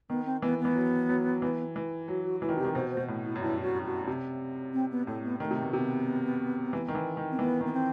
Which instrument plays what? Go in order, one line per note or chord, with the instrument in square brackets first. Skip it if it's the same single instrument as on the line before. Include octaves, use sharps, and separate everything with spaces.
[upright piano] D#3 [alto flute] B3
[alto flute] C4
[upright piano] E3 [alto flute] B3
[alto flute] B3
[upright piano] E3
F#3
F#3
E3
E3
[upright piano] F#3 [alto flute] F#4
[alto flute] F#4
[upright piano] E3 [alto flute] E4
[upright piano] D#3
[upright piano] C3 [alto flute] G4
[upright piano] D#3
[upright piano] B2 [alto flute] C5
[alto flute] C5
[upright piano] B2
A2
[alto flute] E4
[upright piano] F#2
[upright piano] G2 [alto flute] E4
[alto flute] F#4
F#4
[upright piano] C3
[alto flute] C4
B3
[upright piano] A2 [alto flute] A3
[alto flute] B3
[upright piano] D#3 [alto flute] A3
[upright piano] C3
B2
[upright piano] C3 [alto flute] B3
[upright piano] E3
D#3
E3
D#3
[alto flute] C4
[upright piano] E3 [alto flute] B3
[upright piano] D#3
[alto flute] B3
C4